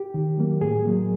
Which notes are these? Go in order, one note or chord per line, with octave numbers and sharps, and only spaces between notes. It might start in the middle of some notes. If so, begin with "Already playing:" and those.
Already playing: G4
D#3
F#3 A#3
A2 G#4
F#3 A#3